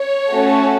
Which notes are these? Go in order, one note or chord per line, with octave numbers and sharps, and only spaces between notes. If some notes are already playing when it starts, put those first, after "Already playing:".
Already playing: C#5
A3 C#4 F#4 A4